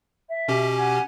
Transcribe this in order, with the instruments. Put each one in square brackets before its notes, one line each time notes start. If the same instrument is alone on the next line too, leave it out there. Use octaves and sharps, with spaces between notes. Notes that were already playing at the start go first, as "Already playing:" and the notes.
[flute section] E5
[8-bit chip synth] B2 C#4 G4
[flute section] F#5 G#5